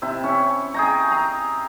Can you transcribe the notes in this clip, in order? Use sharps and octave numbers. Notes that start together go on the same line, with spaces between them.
C3 E4
C#4
G#4 G5 A#5
A#5